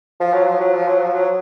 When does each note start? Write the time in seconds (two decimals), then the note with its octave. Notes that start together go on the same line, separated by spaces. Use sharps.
0.20 F3
0.33 F#3
0.47 F3
0.60 F#3
0.74 F3
0.88 F#3
1.01 F3
1.14 F#3